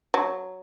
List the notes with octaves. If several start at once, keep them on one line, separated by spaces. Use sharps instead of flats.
F#3